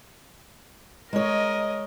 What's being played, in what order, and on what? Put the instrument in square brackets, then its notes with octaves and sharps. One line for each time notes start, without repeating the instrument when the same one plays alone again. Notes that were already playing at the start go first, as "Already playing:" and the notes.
[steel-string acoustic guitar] G#3 C#5 [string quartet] A#4 D#5